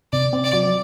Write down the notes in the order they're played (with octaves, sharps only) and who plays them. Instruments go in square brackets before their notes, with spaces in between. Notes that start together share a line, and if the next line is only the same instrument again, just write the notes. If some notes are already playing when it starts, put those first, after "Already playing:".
[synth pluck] C3 [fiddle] D5
[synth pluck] C4
[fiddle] D5
[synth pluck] F#3